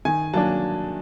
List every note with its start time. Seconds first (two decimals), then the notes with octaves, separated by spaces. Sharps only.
0.05 D#3 G#5
0.34 F#3 A#3 D4 A5